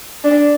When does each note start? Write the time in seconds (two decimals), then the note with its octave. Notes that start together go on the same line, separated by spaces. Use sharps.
0.24 D4